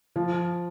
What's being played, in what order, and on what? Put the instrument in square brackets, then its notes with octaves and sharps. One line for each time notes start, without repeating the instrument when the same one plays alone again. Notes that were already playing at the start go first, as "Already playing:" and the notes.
[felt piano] F3